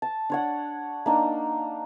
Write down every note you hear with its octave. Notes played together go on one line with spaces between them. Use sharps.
A5
D4 C#5 F#5
A#3 D4 D#4